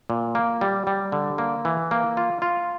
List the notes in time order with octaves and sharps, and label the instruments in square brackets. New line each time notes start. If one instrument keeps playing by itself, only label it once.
[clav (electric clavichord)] A#2
A#3
G3
G3
D3
A#3
E3
A#3
F4
F4